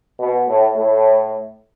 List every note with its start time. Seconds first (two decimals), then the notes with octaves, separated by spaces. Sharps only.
0.19 B2
0.47 A2
0.75 A2